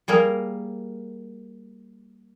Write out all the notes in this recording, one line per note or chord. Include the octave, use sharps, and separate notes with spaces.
G3 A#3 G#4 A#4